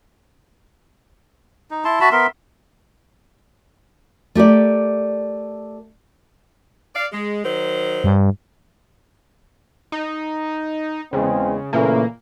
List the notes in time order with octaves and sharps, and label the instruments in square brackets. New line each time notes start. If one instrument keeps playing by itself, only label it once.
[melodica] D#4
E4 A5 C6
F#4 E5 A5 B5
B3 A#4 E5 C6
[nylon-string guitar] A3 G4 A#4 D5
[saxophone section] D5 F5
G#3
D#3 F#3 C5
[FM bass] G2
[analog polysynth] D#4
[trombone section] E2 G#3 C4 [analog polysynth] C#3
[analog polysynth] A#2 A#3 [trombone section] C#3 E3 A3